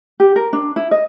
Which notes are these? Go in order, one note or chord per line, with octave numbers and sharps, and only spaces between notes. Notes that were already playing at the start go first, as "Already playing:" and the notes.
G4
A#4
D4
E4
D#5